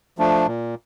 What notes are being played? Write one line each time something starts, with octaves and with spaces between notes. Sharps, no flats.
F3 A3 D4
A#2